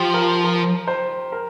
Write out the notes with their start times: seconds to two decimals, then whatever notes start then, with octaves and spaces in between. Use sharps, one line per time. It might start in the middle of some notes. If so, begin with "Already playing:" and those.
Already playing: F3 F4 G4
0.14 A#4
0.44 A#4
0.87 C5
1.32 A#4